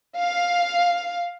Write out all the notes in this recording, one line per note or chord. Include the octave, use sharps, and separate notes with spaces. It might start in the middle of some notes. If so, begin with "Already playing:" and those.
F5